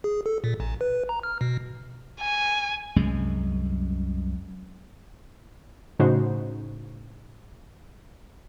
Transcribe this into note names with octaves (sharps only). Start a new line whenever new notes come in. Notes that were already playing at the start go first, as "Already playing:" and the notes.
G#4
A4
A#2
A1
B4
A#5
F6
B2
G#5
C2 F#2 G#3
A2 C#3 A3 D#4 F#4 C5